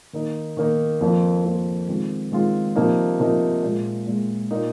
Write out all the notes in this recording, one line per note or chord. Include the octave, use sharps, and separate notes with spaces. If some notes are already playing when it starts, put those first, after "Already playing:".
D#3 A#3 D#4
D#3 A#3 D#4
F2 F3 A#3
F2 F3 A#3
D#3 G#3 C4 F4
D#3 G#3 C4 F4
C3 F3 A#3 D#4
C3 F3 A#3 D#4
A#2 G#3 F4
A#2 G#3 F4
A#2 A#3 D#4